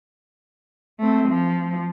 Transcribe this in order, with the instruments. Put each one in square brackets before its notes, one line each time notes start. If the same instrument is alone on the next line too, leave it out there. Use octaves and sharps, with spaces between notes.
[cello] A3 C4
F3